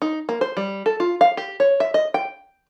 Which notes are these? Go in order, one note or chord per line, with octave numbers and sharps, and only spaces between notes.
D#4
A#3
C5
G3
A4
F4
F5
G4
C#5
E5
D#5
G5